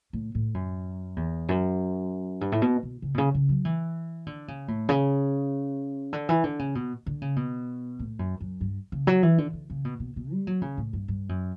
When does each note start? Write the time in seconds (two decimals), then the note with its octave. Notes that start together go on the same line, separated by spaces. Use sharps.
0.13 A2
0.35 A2
0.54 F#2
1.16 E2
1.49 F#2
2.41 G2
2.52 A2
2.62 B2
2.83 B2
3.02 C#3
3.14 B2
3.18 C#3
3.34 C#3
3.49 F#3
3.65 E3
4.27 D3
4.48 C#3
4.68 A2
4.89 C#3
6.13 D3
6.29 E3
6.44 D3
6.59 C#3
6.75 B2
7.06 D3
7.22 C#3
7.36 B2
7.99 A2
8.19 F#2
8.41 F#2
8.61 G2
8.92 C#3
9.07 F#3
9.23 E3
9.38 D3
9.53 D3
9.70 C#3
9.85 B2
10.00 B2
10.16 B2
10.32 G3
10.47 F#3
10.62 C#3
10.77 A2
10.93 G2
11.08 G2
11.29 F#2